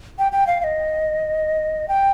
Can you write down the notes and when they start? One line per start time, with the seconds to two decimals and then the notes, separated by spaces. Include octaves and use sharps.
0.19 G5
0.32 G5
0.47 F5
0.61 F5
0.64 D#5
1.88 G5